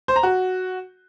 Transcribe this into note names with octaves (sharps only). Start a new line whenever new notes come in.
C5
A#5
F#4